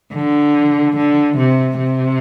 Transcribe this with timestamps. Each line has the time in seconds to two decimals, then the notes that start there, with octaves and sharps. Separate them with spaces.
0.15 D3
0.96 D3
1.37 C3
1.78 C3